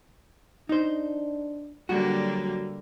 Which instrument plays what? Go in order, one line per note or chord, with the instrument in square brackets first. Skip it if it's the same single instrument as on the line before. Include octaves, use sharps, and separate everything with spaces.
[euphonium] D4 [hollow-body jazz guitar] D#4 C5
[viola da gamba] D3 G3 A#3 [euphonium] F#3 [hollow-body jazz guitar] F#4